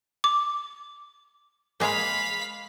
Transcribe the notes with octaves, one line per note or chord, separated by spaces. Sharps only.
D6
G#3 A#3 F5 B5